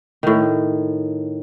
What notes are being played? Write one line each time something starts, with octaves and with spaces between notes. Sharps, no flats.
A2 D#3